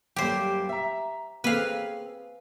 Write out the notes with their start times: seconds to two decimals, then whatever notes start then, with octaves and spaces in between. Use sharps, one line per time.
0.16 F#2 G3 A#3 G4 C5
0.69 E5 A#5
1.44 A#3 C4 G#4 B4 F5